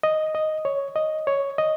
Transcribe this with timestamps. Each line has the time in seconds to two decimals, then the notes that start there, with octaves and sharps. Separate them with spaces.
0.03 D#5
0.35 D#5
0.65 C#5
0.96 D#5
1.27 C#5
1.58 D#5